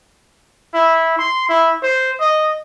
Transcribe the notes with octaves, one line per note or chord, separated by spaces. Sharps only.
E4
C6
E4
C5
D#5